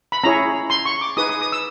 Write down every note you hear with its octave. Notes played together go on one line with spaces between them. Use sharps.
B5
C#4 E4 G#4 C#5 A#5
C6
C#6
D6
D#4 G#4 B4 D#6
D#6
D#6
E6